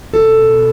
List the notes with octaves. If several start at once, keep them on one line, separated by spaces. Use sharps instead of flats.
B2 A4